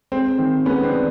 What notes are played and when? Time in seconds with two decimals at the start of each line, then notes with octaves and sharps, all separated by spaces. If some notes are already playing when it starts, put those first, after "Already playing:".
0.12 G#3 C4
0.38 D#3 C4
0.65 G#3 B3 C#4
0.83 C4 D4
0.93 D#3